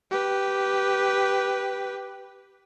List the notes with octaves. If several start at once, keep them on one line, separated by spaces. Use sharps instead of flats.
G4 B4